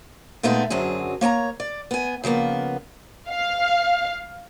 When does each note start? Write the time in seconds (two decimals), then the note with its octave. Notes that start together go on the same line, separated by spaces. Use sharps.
0.43 A#2 G#3 A3 B3 D#4 A4
0.70 F#2 D3 F#3 C4 G#4
1.21 A#3 C#5 A5 A#5
1.60 D5
1.91 B3 G#5
2.24 C#3 F3 A#3 B3
3.29 F5